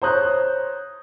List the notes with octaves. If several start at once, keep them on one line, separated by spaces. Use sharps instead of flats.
C5 C#5 A#5 D#6 F#6 G6